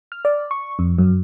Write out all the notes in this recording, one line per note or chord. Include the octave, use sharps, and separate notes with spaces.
F6
D5
C#6
F2
F#2